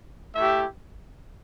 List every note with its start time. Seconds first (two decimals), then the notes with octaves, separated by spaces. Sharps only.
0.35 A3 E4 G4 E5